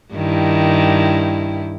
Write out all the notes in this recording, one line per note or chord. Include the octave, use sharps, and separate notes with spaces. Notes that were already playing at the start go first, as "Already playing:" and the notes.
G2 D#3 E4